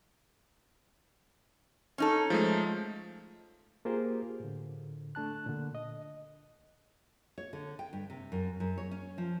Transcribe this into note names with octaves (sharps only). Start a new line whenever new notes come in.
C#4 D#4 A4
F3 G#3 A3
A#3 F4 G4 G#4 A#4 C5
A2 D3
A3 D4 A5 F#6
A#2 D3
D#5
C#5
D3
G5
G2
C3
F#2
F#2
C#5
C#4
F3